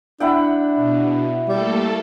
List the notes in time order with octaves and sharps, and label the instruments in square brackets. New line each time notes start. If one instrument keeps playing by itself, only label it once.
[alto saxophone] D4 [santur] E4 F#5 G5
[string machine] B2
[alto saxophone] G3 [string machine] A3 A#3 A4